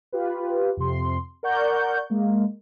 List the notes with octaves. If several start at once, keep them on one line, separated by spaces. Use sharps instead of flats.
F4 G4 B4
F2 C3 C6
A#4 D5 F#5 C#6 G6
G#3 A#3